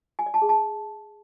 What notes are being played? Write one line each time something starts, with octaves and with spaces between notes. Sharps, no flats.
G#5
D5
A5
G#4
A5